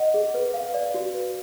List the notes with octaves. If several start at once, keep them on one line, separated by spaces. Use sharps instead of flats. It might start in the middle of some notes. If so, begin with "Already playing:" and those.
Already playing: D#5 F#5
G#4
B4
F5
D5
F#4
B4